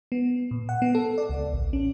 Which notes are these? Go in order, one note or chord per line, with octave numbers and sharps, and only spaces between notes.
B3
A#2
F#5
B3
A4
D5
C#2
A1
C#4